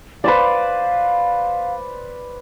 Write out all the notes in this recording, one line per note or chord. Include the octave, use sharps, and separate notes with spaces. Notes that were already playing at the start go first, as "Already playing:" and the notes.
B4 C5 D5 F5